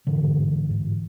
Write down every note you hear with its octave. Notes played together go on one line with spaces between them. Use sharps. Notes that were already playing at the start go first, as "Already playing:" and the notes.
G#2 D3 E3
G#2
G#2
G#2
G#2